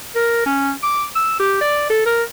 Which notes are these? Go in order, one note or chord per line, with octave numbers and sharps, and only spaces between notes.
A#4
C#4
D6
E6
G4
D5
A4
A#4